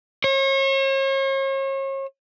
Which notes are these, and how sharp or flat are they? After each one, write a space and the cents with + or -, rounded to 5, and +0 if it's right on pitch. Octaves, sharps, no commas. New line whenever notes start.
C#5 -40